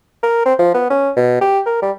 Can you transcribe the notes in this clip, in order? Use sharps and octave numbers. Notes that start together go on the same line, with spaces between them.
A#4
C4
F3
B3
C#4
B2
G4
A#4
G3